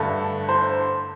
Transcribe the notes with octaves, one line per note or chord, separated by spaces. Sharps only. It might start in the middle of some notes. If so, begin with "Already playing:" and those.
Already playing: G2 D3 A3 A5
C5